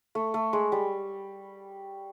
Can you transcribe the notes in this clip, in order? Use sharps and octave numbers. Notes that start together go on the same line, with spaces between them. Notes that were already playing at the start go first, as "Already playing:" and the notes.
A3
A3
G#3
G3